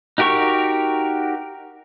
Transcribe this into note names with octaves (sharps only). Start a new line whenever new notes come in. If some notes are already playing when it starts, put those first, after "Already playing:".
D#4 F#4 G4 A#4 C#6